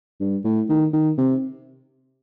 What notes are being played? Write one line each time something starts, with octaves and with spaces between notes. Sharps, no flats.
G2
A2
D#3
D#3
C3